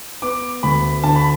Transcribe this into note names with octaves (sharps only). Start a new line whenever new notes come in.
B3 D6
D2 B5
D3 A5
B5